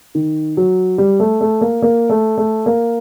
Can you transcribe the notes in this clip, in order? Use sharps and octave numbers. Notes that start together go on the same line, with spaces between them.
D#3
F#3
G3
A3
A3
A#3
A#3
A3
A3
A#3